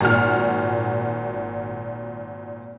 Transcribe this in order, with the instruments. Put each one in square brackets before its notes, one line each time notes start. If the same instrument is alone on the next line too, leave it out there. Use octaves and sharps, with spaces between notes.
[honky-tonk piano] G#1 A#2 F#4 F6